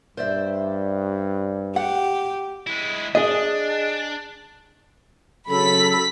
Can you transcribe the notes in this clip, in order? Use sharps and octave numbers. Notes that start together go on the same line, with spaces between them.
G2 C5 D5 E5
G4 F#5
G#3 E4
D4 G#4 D#5
C#3 F#3 A4 B5 B6